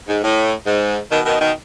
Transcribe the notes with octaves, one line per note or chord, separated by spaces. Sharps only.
G#2
A2
G#2
B2 D#3
B2 D#3
B2 D#3